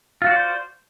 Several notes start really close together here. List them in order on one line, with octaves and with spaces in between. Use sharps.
F4 F#4 D5 C5